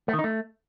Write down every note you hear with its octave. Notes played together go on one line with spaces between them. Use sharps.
A3
D#3
D#4
A3